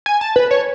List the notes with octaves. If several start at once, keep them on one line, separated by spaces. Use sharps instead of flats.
G#5
A5
B4
C#5